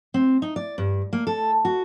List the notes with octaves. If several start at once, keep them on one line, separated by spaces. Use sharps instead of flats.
C4
D#4
D5
G2
A#3
A4
F#4